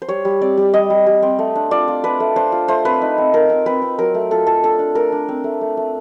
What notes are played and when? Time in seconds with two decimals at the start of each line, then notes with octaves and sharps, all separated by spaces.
0.02 C5
0.08 G3 C#5
0.25 G3
0.41 C4 D5
0.57 G3
0.74 G3 D#5
0.90 G3
1.06 G3
1.22 C4
1.39 A3
1.55 D4
1.71 F4 D5
1.88 F4
2.04 D4 B4
2.20 A3
2.36 D4 C5
2.52 F4
2.68 A3 C5
2.85 C4 B4
3.01 D#4
3.18 C4
3.33 C4 A#4
3.50 C4
3.66 C4 B4
3.82 C4
3.99 F#3 A#4
4.14 A3
4.31 F4 A4
4.47 F4 A4
4.63 D4 A4
4.79 D4
4.95 A3 A#4
5.12 D4
5.29 C4
5.44 A3
5.61 A3
5.77 A3